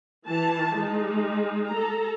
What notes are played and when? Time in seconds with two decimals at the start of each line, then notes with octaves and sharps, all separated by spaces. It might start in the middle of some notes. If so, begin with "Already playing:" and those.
0.24 E3 A5
0.74 G#3 D#4
1.69 A4 A#5